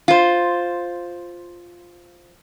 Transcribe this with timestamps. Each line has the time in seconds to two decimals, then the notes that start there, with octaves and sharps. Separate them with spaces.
0.08 F4 C5